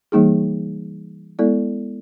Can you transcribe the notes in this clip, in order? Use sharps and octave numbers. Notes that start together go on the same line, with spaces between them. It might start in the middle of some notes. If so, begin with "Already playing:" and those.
E3 G3 A#3 D#4 G#4
G#3 B3 E4 A4 D5